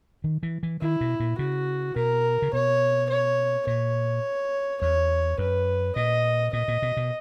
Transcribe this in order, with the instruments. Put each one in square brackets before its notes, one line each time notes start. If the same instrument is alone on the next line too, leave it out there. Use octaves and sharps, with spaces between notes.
[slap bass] D#3
E3
E3
[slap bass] D#3 [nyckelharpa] E4
[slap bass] B2
A#2
[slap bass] C#3 [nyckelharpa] F#4
[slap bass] B2 [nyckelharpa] A#4
[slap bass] C#3
[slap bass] B2 [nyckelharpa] C#5
[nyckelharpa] C#5
[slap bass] A#2 [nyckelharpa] C#5
[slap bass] E2 [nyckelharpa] C#5
[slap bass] F#2 [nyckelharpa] B4
[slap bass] A#2 [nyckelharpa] D#5
[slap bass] A#2 [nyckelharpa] D#5
[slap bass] A#2
B2
B2